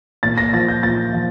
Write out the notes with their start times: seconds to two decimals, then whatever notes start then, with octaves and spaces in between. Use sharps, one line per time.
0.23 A#2 A6
0.38 A#6
0.53 F3 A6
0.68 G6
0.83 A#2 A6
1.13 F3